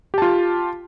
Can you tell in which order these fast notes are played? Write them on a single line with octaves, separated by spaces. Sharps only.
G4 A5 F4